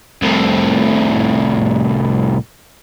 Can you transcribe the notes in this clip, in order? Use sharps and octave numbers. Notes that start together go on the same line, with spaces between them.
C2 A2